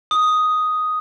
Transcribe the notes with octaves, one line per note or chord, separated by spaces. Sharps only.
D#6